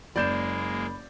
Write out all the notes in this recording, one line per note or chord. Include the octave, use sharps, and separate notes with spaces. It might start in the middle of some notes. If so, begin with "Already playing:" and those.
F#1 G#3 A#3 D5 B5 G6 E7